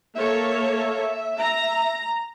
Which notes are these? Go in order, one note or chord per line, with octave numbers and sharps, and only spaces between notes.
A#3 A4 C#5 E5
A#5